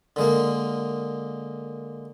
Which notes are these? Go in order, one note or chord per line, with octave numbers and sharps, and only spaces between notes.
D3 G#3 A#3